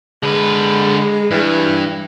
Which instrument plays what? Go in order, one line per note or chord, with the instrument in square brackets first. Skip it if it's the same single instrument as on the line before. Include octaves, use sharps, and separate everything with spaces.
[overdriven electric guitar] D3 B4 [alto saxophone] G#3
[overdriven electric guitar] G2 [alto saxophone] E3